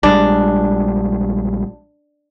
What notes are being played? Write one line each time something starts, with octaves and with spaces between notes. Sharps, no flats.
A#1 G3 G#3 D4